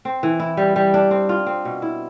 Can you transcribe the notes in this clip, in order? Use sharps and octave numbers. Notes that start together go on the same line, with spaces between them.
C4
E3
E4
G3
G3
D4
C4
F4
C4
B2
E4